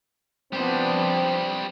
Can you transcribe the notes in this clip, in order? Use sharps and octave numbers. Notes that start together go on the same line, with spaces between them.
F3 G3 B3 C4 D4 C5